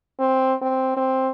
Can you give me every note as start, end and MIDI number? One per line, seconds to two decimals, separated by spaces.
0.20 0.54 60
0.62 0.93 60
0.97 1.31 60